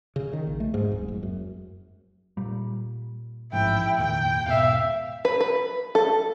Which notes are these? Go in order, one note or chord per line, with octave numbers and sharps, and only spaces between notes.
C#3
D#3
A#1
A3
G#2
D1
F#1
F#2
A#2 G3
A1 G#2 F3 E4 G5
F1 D#2 A#2 G5
E1 G#2 B2 E5 F5
B4
B4
A4